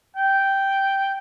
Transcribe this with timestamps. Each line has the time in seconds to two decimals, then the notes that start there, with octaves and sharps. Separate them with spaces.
0.17 G5